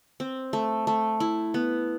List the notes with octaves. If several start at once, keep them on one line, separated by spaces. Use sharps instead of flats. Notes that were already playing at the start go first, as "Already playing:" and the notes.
C4
A3
A3
E4
B3